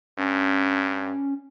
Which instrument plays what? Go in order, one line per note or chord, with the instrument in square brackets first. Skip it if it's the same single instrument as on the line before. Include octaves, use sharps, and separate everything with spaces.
[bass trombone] G2 [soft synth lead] C#4